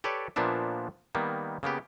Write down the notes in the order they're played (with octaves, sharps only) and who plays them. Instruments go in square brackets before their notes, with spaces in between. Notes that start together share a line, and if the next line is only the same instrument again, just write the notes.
[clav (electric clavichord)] G4 A4 B4 C#5 D5
A#2 F3 A#3 B3 D4 E5
D#3 G3 A#3 B3
C#3 A#3 B3 G4